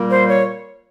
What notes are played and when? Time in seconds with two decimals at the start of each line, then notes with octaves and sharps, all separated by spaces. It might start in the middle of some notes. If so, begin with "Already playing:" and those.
Already playing: A#2 G3 A#3
0.10 C5
0.28 C#5